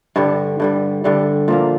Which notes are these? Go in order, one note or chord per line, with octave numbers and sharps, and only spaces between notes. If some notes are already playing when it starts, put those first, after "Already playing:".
G2 D3 G3
G2 D3 G3
G2 D3 G3
A#2 F3 A#3